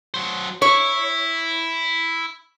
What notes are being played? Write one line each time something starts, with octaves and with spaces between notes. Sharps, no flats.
F#3 C5
E4 C#5